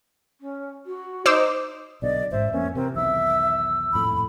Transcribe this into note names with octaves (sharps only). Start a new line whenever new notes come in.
C#4
F#4
D#4 C5 D6 E6
B1 B2 D3 D5 D#5
A1 G#2 C5 E5
F2 A#3 B3 C#4
C3 E3 C4 A#4
B1 E2 D#3 E5 E6
D#1 F2 A2 B5